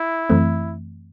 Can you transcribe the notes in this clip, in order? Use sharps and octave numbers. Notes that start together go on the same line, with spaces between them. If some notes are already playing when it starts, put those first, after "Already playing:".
Already playing: E4
F#2 E3 A3 C4